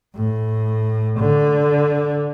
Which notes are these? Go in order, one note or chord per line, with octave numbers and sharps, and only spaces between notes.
A2
D3